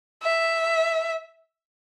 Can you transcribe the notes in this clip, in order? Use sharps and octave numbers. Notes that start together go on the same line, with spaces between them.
E5